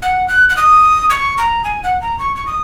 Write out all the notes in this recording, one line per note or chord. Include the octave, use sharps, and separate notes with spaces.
F#5
F#6
F#6
D#6
C#6
A#5
G#5
F#5
A#5
C#6
C#6
D#6